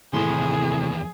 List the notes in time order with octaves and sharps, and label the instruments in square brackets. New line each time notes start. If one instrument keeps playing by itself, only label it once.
[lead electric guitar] D#2 E3 [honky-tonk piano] A2 [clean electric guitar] C3 C6 [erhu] G#4